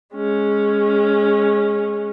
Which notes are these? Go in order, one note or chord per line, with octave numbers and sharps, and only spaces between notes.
G#3 C#4